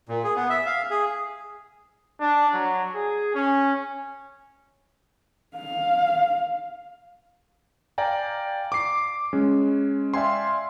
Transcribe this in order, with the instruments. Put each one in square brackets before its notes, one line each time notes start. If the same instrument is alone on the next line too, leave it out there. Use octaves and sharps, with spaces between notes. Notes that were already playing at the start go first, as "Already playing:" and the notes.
[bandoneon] A#2
G#4
B3
E5
F5
G#4
[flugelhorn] D4
F#3
G#4
C#4
[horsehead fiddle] F5
[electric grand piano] D5 F5 G5 G#5 A#5
D6 C7
G#3 C#4
D5 E5 F5 G5 G#5 C6